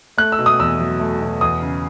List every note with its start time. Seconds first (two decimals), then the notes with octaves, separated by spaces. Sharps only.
0.18 A3 F#6
0.32 E6
0.39 B2
0.46 D#6
0.60 E2 E6
0.79 F#3
1.00 A3
1.21 B2
1.41 E2 D#6
1.62 C#3